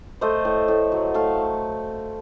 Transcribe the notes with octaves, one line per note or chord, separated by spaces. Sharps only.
A3 C5 D#5
A2
A2
F#3
A3 F5 A5